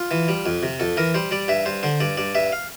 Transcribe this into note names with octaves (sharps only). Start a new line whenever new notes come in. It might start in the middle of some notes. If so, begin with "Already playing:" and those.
Already playing: F4
E3
G3
F2
C3
F2 A4
E3 A#4
G3 C5
G3 D5
G2 E5
G2 C5
D3 C5
G2 D5
G2 D5
G2 E5
F5